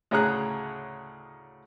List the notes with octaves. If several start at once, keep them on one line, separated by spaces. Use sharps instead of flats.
D2 A2 C#3 G#4 A#5 F#6